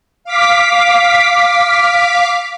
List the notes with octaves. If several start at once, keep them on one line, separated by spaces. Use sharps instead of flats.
F5 D6 B6